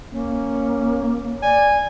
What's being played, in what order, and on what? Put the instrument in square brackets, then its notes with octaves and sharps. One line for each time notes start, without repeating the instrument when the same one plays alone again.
[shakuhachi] A#3 [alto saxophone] C#4
[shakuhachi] D5 [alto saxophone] G#5